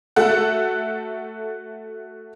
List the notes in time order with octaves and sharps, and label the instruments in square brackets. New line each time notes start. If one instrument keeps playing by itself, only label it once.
[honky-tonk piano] A3 F#4 A4 F#5